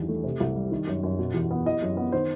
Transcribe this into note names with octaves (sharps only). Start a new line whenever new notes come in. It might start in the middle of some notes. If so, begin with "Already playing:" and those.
Already playing: E2 G2 D#3
A3
C3
C2
G3
D#3
F#2
F#2
B2
E2
B3
E3 D#5
F#2
B3
D#3 C5